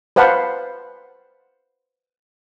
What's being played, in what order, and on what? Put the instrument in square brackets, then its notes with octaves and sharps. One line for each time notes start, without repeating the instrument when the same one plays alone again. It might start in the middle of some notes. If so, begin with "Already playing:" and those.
[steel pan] B4 C5 F5 F#5 A5 B5